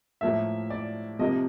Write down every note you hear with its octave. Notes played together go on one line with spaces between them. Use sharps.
A2 F3 A#3 E5
D5
C3 F3 A#3 D#5